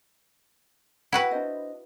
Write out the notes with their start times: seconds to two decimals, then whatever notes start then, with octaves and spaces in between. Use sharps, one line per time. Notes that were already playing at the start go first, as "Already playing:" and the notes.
1.12 E4 F#4 B4 F#5 G5
1.31 D4 C5 D#5